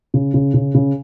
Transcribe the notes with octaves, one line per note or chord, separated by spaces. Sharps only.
C#3
C#3
C#3
C#3